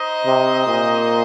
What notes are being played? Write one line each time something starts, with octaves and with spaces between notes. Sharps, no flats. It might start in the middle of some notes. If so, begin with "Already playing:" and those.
Already playing: D#4 C5 D#5
C3
A#2